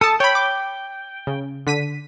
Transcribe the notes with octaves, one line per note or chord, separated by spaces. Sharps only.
A4 A5 D#6
C#5 G5 B5
D6
C#3
D3 B6 D#7